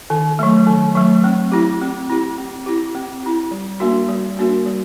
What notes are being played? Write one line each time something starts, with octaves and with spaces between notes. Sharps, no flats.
D#3
F#3 A3
D#3
F#3 A3
C4
E4 G4
C4
E4 G4
C4
E4 G4
C4
E4 G4
G3
A#3 D4 F#4 A#4
G3
A#3 D4 F#4 A#4
G3